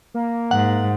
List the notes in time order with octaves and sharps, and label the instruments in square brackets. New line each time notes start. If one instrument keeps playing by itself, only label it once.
[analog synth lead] A#3
[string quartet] G#2 [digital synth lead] F#5